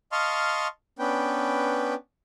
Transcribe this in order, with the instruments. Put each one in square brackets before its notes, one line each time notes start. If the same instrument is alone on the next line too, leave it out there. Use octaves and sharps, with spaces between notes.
[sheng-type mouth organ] D#5 F5 A5 C6 C#6 F6
B3 C#4 D4 B4 G5